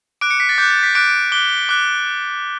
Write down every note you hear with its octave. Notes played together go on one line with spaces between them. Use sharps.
D6 F#6 D7
C#7
B6
A6
D6 F#6 G6
A6
B6
D6 F#6 D7
D7
D6 F#6 G7
D6 F#6